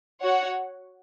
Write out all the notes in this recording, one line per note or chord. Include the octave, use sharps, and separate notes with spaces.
F#4 C#5 F#5